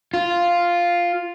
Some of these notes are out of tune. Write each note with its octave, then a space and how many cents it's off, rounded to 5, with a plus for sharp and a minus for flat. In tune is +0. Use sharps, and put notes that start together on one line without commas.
F4 +0